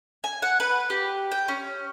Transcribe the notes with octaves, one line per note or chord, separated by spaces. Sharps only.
G#5
F#5
B4
G4
G5
C#4